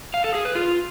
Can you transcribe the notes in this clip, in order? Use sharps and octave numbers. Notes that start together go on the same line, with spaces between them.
F5
A4
G#4
B4
F4